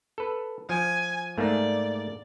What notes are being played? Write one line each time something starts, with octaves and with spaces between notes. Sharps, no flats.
A4 B4
F3 G#5
G#2 A3 A#3 D5